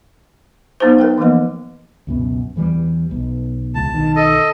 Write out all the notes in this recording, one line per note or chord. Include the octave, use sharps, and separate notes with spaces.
F#3 B3 D#4 G4 C5
A#4 B4 G5
E3 F3 A#3 B3 D#5
C#2 F#2 B2
E2 E3 G3
B1
E1 C#2 A5
B1 D#3
A4 D#5